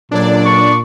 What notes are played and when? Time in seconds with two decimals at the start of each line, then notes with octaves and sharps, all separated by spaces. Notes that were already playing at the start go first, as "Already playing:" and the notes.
0.12 C#2 A#2 D3 F#3 D4 D5
0.46 C#6